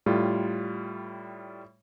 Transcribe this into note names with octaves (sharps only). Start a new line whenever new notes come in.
A2 G3 F4